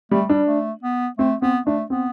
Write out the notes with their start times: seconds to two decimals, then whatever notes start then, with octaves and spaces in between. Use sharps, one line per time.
0.11 G3 A3
0.29 G3 D4
0.47 A3
0.83 B3
1.18 A3 C4
1.42 B3 C4
1.67 A3 D4
1.90 B3 C4